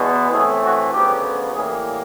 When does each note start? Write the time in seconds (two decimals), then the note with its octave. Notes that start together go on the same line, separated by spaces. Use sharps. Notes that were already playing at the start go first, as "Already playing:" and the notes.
Already playing: E2 B2 G#3 B3
0.30 A2 E3 A3 C4 G#4
0.61 F#4
0.91 D2 C#3 F#3 B3 G4
1.52 A2 E3 G3 A#3 G#4